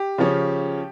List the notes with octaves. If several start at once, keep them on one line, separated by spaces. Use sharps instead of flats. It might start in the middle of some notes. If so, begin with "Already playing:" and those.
Already playing: G4
C#3 F3 C#4